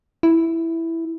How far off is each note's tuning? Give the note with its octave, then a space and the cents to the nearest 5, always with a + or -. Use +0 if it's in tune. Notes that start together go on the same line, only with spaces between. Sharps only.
E4 +0